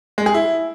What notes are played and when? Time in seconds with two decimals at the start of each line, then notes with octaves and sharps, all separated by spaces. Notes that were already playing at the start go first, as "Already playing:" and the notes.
0.18 G#3
0.26 G#4
0.34 E4